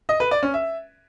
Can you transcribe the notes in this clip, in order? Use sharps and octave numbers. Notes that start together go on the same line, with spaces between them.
D#5
B4
D5
C#4
E5